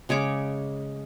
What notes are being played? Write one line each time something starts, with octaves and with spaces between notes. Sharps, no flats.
C#3 G#3 C#5 D6